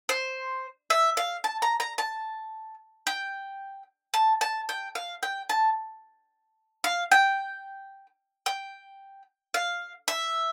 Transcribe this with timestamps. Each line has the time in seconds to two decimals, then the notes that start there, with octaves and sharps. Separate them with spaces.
0.09 C5
0.90 E5
1.17 F5
1.44 A5
1.62 A#5
1.80 A#5
1.98 A5
3.07 G5
4.14 A5
4.41 A5
4.69 G5
4.95 F5
5.23 G5
5.49 A5
6.84 F5
7.12 G5
8.46 G5
9.54 F5
10.08 E5